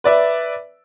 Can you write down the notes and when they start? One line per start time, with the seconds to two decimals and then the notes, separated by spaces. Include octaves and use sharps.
0.04 B4 D5 E5